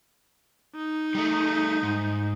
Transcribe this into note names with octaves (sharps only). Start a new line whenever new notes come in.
D#4
G3 A3
G#2